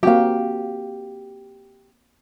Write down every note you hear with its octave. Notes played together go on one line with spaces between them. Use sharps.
A#3 C4 F#4 G4 F5